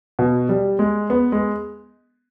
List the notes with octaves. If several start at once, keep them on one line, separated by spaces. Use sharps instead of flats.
B2
G3
G#3
B3
G#3